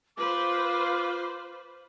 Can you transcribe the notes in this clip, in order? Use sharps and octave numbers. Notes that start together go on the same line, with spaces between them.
F4 B4 C5 D6